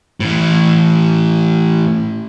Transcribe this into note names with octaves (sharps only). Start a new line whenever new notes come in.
A2 E3